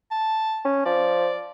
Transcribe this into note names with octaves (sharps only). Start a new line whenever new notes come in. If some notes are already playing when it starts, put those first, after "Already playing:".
A5
C#4
F3 D5